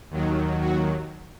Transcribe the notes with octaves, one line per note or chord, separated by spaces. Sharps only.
D#2 D#3 F#3
F#4